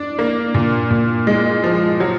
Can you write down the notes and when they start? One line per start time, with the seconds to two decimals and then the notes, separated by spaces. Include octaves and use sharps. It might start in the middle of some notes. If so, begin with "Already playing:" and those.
Already playing: D4
0.19 A#3
0.55 A#2
0.91 A#2
1.27 G#3
1.64 F3
2.00 F#3